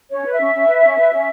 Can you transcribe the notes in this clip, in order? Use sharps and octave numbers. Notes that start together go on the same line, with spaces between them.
C#4 C#5
B4
E5
C#4
C#4
B4
C#4
B4
C#4